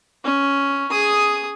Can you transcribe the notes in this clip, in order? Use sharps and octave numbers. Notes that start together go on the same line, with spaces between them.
C#4
G#4 D#6